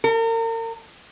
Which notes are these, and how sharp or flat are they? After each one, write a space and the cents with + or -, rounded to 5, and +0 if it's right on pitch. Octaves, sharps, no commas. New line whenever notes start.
A#4 -40